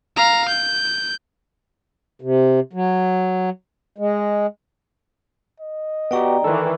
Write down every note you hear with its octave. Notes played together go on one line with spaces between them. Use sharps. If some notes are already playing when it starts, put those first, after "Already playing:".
F5 A#5
G6
C3
F#3
G#3
D#5
B3 F#4 G4 D5 G5 A#5
D#3 E3 A4 B4